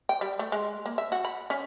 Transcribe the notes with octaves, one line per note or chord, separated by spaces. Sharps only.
G5
G3
A3
G#3
A#3
E5
F#4
B5
C#4